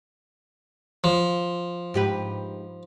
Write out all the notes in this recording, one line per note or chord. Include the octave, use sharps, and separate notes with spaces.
F3
G#2 G4 B4